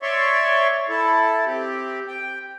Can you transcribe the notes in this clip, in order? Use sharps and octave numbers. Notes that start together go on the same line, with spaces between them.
C#5 D5 E5 C6 C#6
E4 A4
C4 G4
G5